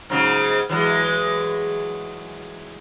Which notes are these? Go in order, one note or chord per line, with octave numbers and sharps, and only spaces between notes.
G#2 C#3 F#3
E3 F#3 G#3